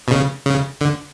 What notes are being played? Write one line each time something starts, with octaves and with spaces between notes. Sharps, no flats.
B2
C#3
C#3
D3